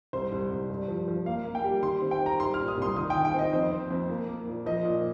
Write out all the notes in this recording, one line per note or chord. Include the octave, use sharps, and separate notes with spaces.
C2 C5
C2
C2
G2
F3
F3
A#3 F5
A#3
G5
G3
D#3 C6
C4
G5
C4
A#5
G3 C6
F6
A#2
D#6
C2 C6
D#3 D#6
G5
D#3
G5
C4 D#5
F2 C5
C4
F2
A#3
A#3
A#2
F3 D#5
A#2